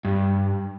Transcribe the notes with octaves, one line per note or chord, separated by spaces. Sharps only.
G2